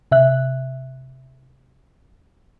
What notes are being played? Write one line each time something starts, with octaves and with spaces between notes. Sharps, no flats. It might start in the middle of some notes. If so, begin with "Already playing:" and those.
C3 E5 F#6